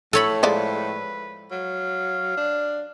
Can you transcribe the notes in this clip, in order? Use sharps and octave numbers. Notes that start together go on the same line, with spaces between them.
A2 A4 C#5 B5
F3 G#3 B4 D5
F#3 F5
D4